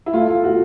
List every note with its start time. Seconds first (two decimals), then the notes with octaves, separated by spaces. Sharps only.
0.06 E4
0.13 A3 F4
0.29 F4
0.44 F#4